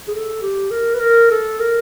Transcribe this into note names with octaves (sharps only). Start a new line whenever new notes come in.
G#4
A4
G4
A#4
B4
A#4
A4
A#4